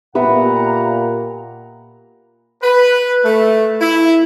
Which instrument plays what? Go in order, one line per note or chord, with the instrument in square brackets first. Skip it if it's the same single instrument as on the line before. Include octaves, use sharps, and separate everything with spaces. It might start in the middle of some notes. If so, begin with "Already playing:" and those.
[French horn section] A#2 [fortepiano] B3 E5 [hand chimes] G4 B5 [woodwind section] F#5 A#5
[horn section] B4
A3
E4